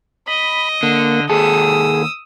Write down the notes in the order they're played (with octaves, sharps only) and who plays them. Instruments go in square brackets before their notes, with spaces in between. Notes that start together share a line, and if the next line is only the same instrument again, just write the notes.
[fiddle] D#5 [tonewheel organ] B5
[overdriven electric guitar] D3 [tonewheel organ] A#3
[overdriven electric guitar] D#2 A4 [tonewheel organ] G#4 [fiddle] D#6 E6